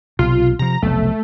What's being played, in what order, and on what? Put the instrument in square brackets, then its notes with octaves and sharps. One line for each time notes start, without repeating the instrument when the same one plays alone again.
[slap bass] B1 C3 [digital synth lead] F4
[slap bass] C3 F3 [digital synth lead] A#5
[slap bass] F1 B1 [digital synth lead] A3